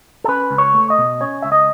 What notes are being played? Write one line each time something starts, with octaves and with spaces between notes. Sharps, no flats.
A4
C#4 B4
C#2
C#5
A3
D#5
B2
C#4 C#5
C#2 E5
D#5